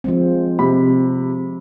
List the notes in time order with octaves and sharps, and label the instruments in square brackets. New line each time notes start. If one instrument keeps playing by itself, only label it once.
[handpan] F3 G#3 C4
[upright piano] C3 B5